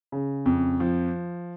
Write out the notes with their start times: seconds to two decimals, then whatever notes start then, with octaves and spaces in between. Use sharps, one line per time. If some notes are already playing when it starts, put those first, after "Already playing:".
0.12 C#3
0.46 F2
0.80 F3